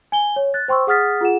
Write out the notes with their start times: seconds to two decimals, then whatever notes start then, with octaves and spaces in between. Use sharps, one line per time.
0.12 G#5 G7
0.36 C#5
0.54 F#6 A6
0.68 C5 G5 C6 C#6 E6
0.87 G#4 F#5 D#6 F6 A6 B6
1.21 F4 G#4 F#5 E7